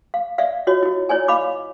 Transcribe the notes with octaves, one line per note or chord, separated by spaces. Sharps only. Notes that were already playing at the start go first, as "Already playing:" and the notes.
F5
D5 E5 F5
F4 F#4 C#5 D#5
E4 F#4
E4 C#5 D5 G#5
D#5 F5 B5 D6